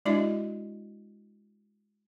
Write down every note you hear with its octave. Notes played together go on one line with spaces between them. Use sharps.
G#3 D4 E4 F#4 D#5 E5